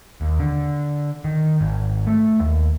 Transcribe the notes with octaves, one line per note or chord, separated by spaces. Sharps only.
D#2
D3
D#3
G#1
A3
D#2